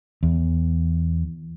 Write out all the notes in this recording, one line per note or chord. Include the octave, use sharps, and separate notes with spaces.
E2